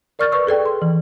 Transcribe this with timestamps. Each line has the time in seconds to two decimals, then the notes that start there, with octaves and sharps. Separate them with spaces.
0.19 A#4 D5 C#6 F6 G6 A6
0.32 B4 D5 C#6 E6
0.47 G#4 A4 D5 G5
0.65 C6
0.82 E3